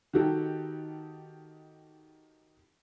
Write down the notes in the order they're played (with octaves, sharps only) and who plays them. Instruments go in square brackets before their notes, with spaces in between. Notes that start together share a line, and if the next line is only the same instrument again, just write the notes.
[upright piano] D#3 D#4 F#4 G4 A4